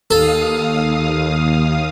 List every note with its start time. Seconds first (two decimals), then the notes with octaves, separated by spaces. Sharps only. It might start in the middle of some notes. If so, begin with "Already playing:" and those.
0.11 D#2 A4 F5 D#6